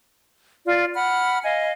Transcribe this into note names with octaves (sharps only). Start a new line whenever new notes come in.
F4 D5
F#5 B5 F6
D#5 F5 G#5